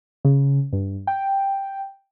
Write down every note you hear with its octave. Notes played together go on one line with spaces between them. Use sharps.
C#3
G2
G5